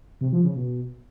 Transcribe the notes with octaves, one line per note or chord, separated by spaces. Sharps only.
C3
F3
C#3
B2